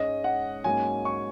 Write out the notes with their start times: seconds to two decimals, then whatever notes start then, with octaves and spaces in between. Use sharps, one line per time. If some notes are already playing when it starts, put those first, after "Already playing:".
Already playing: G#2 G#3 C#4 D#5
0.24 F#5
0.64 G#2 F#3 A#3 C#4 G#5
1.05 C#6